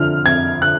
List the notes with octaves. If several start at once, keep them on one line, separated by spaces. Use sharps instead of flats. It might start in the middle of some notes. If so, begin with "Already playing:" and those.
Already playing: F2 D3 F3 F6
F2 G#6
D3 F#6